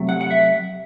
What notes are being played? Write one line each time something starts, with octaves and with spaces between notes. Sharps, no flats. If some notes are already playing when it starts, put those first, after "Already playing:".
Already playing: C3 F#3 A3
F#5
F#5
E5